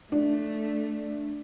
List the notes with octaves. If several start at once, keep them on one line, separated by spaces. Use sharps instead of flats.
A3 D4